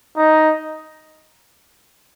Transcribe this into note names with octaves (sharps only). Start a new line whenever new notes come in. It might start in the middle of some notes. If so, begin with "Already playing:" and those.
D#4